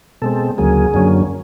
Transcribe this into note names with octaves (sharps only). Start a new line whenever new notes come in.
B2 G#3 C4 A4
D2 C#3 F#3 A#3 G#4
F#2 D3 F#3 A#3 C#4